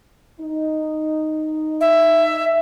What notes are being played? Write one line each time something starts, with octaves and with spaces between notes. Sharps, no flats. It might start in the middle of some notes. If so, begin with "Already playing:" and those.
D#4
E5